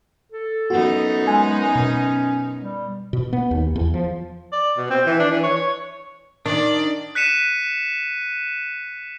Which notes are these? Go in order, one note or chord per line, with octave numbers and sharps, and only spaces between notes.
A4
F#2 B3 D#4 F#4
G#3 G#5
B2 C#4
G3
B2
B3
D#2
E2
F3
D5
B2
C4
E3
D4
E3
C#5
C#5
D#3 D4 D5
F#6 B6 C#7 D#7 E7